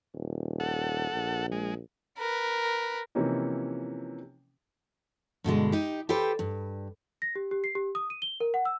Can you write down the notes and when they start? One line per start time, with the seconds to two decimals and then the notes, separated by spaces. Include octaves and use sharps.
0.15 D#1
0.60 A4 F#5
1.12 A#1
1.52 G#3
2.18 A#4 B4
3.15 C3 E3 F3 A#3 C#4 D#4
5.44 G2 B2 D3 G#3
5.72 D#4 G4
6.09 G4 A4 B4 C5 G5
6.39 G2
7.22 A#6
7.36 G4
7.51 G4
7.64 C7
7.75 G4
7.95 D#6
8.10 D#7
8.22 G7
8.40 A#4
8.54 F#5
8.65 E6